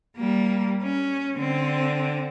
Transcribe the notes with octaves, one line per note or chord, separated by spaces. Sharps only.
G3 A#3
C#4
D3 C4